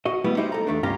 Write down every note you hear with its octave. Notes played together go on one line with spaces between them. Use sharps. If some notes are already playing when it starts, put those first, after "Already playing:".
F#4 D#5
G3 A3 B3 E4
D#4 E4 G4 C5
A4 A#5
D#2 A3 D4
C#2 G2 C#4 F4 G4 A#5